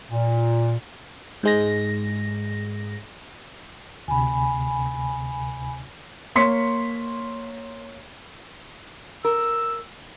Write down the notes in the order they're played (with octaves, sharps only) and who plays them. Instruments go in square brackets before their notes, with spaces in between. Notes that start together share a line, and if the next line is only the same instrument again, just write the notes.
[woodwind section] A#2
[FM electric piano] G#2 G#3 A#6
[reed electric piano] D2 C3 [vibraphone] G#5 B5
[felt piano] A#3 C#5 C6 B6 C#7
[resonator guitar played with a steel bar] A#4 [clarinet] E6